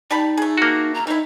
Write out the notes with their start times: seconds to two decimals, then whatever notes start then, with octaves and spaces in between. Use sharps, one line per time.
0.11 G3 D#4 A5 B5
0.37 A3 G#4
0.58 A#3 F#4
0.94 A#5
1.07 D#3 D#4 E4